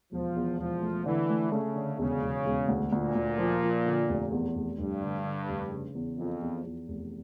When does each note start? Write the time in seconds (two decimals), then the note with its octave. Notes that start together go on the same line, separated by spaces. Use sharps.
0.12 E1 F3
0.36 E2
0.59 E1 F3
0.82 A3
1.06 D3 E3
1.30 A3
1.52 C#3 A3
1.76 D3
1.98 E1 C#3
2.22 E1
2.46 E1
2.68 D2
2.92 D2 A#2
3.15 D2
3.38 F3
3.62 F3
3.86 D3
4.09 F1
4.32 E2
4.55 F1
4.78 F1 G2
5.02 D3
5.24 D3
5.49 F1
5.71 C#3
5.95 E2
6.18 F2 F3
6.42 E2
6.64 E2
6.88 F1